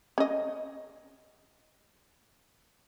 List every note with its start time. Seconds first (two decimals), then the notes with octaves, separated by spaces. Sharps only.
0.18 C#4 D#5